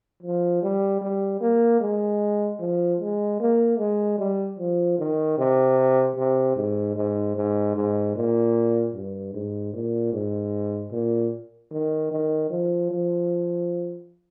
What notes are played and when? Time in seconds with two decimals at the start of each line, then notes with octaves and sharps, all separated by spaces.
0.23 F3
0.62 G3
1.01 G3
1.40 A#3
1.80 G#3
2.59 F3
3.00 G#3
3.40 A#3
3.78 G#3
4.18 G3
4.58 F3
4.98 D#3
5.38 C3
6.16 C3
6.56 G#2
6.95 G#2
7.36 G#2
7.75 G#2
8.15 A#2
8.94 G2
9.34 G#2
9.73 A#2
10.13 G#2
10.92 A#2
11.71 D#3
12.11 D#3
12.50 F3
12.90 F3